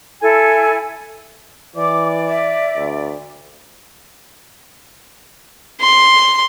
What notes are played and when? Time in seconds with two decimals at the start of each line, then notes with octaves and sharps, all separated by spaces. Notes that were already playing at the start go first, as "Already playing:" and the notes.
0.22 E4 A4 G#5
1.76 E3 D5 D6
2.28 E5
2.76 D2
5.81 C6